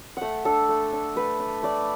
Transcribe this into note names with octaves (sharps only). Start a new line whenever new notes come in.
A3 E5 F#5
D4 A4
A3
D4
A3 B4
D4
A3 D5